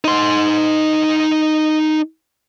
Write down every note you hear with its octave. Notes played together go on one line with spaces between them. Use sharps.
D#4 C6